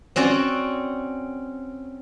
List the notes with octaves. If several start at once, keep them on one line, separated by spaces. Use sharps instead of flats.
C4 C#4 F#4 D5